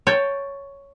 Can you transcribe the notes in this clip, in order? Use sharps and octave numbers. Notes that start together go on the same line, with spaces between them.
C#5 G5 A5